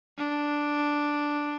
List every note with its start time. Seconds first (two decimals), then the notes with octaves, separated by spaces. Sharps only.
0.18 D4